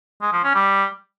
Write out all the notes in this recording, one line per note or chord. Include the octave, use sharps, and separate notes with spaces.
G#3
F3
C#4
G3